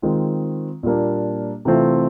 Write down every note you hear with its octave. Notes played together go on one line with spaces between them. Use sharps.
D#3 G#3 C4 F4
A#2 G3 A#3 D4
C3 E3 A3 C4 F4